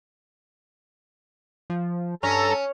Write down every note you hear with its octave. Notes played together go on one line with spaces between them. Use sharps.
F3
G2 C#4 A4 A#5